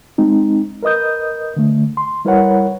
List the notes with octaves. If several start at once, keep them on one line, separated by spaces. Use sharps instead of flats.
G#3 C4 D#4
A#4 B4 D#5 D#6 G6
D3 A3
C6
G3 E4 A#4 B4 C#5 F#5